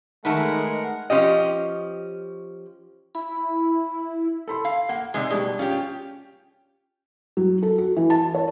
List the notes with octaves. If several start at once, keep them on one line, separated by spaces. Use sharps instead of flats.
D#3 G#3 A3 D#4 A#4 B4 F#5
F3 C#4 G4 D#5
E4 B5
A4 B5 C6
F5
A#3 F#5
C3 G#3 D#4 D5
B2 G3 D4 G#4
C#4 F4 G4
F#3
A4
F#4
E3
A5
C#5